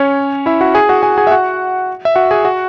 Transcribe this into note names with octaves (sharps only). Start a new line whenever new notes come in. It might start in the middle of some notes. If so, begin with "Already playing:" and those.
Already playing: C#4 C#5
E4 E5
F#4 F#5
G#4 G#5
F#4 F#5
G#4 G#5
G#4 G#5
E5
F#4 F#5
E5
F#4 F#5
G#4 G#5
F#4 F#5